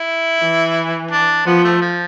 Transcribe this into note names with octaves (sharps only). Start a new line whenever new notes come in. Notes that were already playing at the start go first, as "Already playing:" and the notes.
Already playing: E4
E3
D4
F3 B3
A3
F3